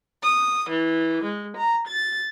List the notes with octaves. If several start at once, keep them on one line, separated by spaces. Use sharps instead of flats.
D#6
E3
G#3
A#5
A6